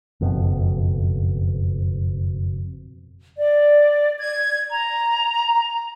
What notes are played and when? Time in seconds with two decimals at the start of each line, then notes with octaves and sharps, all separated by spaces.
0.21 F#1 F2 B2
3.38 D5
4.18 G#6
4.70 A#5